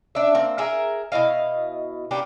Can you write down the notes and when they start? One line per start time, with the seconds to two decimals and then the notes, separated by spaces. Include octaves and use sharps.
0.15 D4 E5
0.35 A#3 C4
0.58 G#4 A#4 E5
1.12 B2 E4 D#5 F5
2.11 A#3 B3 D4 G4